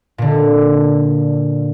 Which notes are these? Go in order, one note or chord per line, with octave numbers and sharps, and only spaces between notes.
A#2 D3